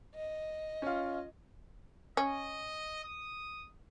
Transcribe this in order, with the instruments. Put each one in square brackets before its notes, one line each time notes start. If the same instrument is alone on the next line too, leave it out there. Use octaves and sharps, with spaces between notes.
[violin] D#5
[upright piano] C#4 F4
[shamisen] C#4 [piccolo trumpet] D#5
[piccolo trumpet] D#6